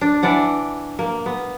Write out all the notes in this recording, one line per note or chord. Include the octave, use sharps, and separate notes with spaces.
D4
E3 D4 D5 F#5
A#3
B3